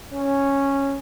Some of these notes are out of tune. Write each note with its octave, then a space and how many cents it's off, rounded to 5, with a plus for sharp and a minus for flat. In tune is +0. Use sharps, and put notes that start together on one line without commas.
C#4 -5